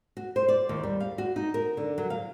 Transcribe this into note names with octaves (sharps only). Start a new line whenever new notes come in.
F#4
C5
D5
D#2
G3
F5
F#4
D#4
A#4
D3
F#3
F5